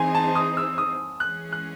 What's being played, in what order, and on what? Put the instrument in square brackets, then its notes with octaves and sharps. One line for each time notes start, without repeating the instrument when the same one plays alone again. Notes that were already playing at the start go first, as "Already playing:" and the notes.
Already playing: [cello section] E3 C4 D#4 G#4 C5 [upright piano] G#5 C6
[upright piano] A5
D#6
E6
D#6
[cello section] E3 G#3 C#4 G#4 [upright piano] F#6
[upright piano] F#6